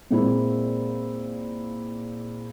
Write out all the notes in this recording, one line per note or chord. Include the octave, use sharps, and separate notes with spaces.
A#2 G#3 A#3 C4 E4